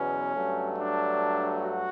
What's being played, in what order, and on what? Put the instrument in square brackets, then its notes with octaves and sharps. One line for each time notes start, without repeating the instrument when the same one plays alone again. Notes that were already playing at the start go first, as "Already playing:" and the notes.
Already playing: [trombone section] E2 B2 F#3 C#4
G2 F#3 A3
D4
F#4